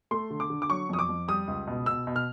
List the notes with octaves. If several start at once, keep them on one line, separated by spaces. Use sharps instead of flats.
A3 C6
D3
D6
D3
D6
F#3 C#6
F2 D#6
D6
F2
G3 D#6
C#2
B2
B2 E6
B2
F6